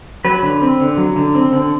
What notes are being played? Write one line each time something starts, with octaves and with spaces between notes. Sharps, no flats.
F#3 B4
D3
C4
D3
F#3
D3
C4
D3